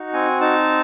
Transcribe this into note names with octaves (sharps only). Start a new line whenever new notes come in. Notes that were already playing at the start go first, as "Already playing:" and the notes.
Already playing: D#4 F#4
C4 G#5
D#4 A5